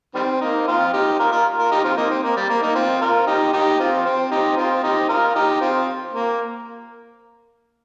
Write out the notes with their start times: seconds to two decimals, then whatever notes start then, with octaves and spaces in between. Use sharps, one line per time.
0.15 D#3 G3 C4
0.41 A#3 D#4
0.67 C4 F4
0.93 D#4 G4
1.19 F4 A#4
1.32 F4 A#4
1.58 F4 A#4
1.71 D#4 G4
1.84 C4 F4
1.97 A#3 D#4
2.10 C4
2.24 A#3
2.37 G3
2.49 A#3
2.62 A#3 D#4
2.75 C4 F4
3.01 F4 A#4
3.27 D#4 G4
3.53 D#4 G4
3.79 C4 F4
4.05 C4
4.31 D#4 G4
4.57 C4 F4
4.83 D#4 G4
5.09 F4 A#4
5.35 D#4 G4
5.61 C4 F4
6.13 A#3